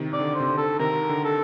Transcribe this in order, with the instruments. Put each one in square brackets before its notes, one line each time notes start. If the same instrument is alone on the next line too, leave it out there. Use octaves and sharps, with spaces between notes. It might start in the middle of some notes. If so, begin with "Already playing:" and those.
Already playing: [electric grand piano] C3 D#3
[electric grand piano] C3 [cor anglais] D5
[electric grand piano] D3
[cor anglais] C5
[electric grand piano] C3
D3
[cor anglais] A4
[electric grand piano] C3 D#3 [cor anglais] A#4
[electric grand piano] D3
[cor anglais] A4